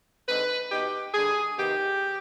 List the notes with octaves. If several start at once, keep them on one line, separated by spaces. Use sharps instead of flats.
D3 G#3 C4 D#4 B4
B2 B3 D#4 G4
D3 G3 D4 G#4
C3 D#3 B3 D#4 G4